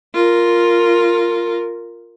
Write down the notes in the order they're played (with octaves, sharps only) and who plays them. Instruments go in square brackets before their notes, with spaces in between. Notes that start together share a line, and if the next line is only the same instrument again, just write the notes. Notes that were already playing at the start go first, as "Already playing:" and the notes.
[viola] F4 A#4